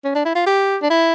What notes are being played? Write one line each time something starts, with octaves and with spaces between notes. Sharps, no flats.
C#4
D4
E4
F4
G4
D4
E4